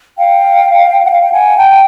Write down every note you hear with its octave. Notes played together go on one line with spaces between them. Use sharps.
F5 G5
F#5
F5 G5
G5
F#5 G#5
G5 A5
A5